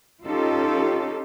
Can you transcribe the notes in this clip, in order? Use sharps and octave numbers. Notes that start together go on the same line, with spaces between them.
C#4 D#4 F4 G4 A4